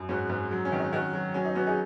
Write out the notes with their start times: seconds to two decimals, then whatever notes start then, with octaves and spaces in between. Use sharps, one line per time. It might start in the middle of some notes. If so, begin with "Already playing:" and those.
Already playing: F#2
0.09 G#2 C#4 F#4
0.30 G#2
0.51 F#3
0.65 C#4
0.72 D#3
0.79 D#4
0.93 D#3 C#4 F#4
1.13 F#3
1.34 F#3 C#4
1.45 D#4
1.55 B3 C#4 F#4
1.66 D#4 G#4